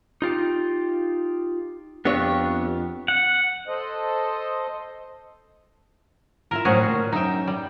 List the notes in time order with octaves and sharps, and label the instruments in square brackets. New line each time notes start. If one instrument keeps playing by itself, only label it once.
[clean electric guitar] D#4 F4 G4
[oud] F2 C#5 [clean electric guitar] B3 D4 G4
[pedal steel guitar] F#5
[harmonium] A4 C5 D#5
[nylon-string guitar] E4 F4 E5 [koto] A#4
[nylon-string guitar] A2 F3 F#3 [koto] C#4 F#4 G#4
[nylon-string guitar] D2 G2 A#2
[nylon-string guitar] F#2 E5 [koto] D#4 G5
[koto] G3